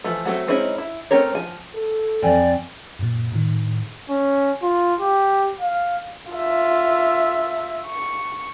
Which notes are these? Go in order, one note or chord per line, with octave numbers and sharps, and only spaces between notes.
E3 F3 A3
F#3 A3 C4
G#3 C4 C#4 D#4 E4
E4
A3 C4 C#4 A#4 C#5
F3 G#5
A4
F2 D5 G5 G#5
F#2 A#2
A2 D#3
C#4
F4
G4
F5
F4 E5
C#6